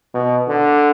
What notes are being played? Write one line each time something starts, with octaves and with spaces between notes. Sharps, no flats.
B2
D3